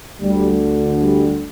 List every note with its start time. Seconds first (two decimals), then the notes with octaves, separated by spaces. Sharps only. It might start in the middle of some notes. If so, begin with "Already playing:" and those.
0.21 D2 D3 G3
0.99 G3